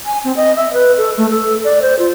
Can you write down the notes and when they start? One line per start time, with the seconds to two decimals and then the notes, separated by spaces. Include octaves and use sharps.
0.05 G#5
0.24 C4
0.36 D#5
0.56 E5
0.73 B4
0.97 A4
1.17 A3
1.30 A4
1.64 D5
1.81 C5
1.98 F4